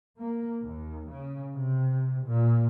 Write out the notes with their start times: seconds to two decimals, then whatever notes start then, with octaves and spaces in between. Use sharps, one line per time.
0.18 A#3
0.62 D#2
1.09 C#3
1.55 C3
2.26 A#2